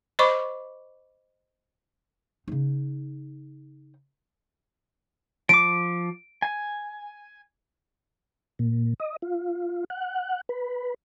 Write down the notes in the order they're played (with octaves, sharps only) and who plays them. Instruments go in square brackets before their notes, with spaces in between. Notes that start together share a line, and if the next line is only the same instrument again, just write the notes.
[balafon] C5 D#5 B5 C#6 D6
[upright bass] C#3 D#4
[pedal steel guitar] F3 D6 [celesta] D7
[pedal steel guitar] G#5
[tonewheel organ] A#2
D#5
F4
F#5
B4